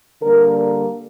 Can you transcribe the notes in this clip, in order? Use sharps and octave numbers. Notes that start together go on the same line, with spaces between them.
D3 G3 A#3 A#4
A#4